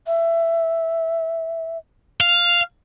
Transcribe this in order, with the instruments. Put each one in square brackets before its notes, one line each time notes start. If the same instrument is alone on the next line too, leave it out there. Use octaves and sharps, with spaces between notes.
[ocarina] E5
[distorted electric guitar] F5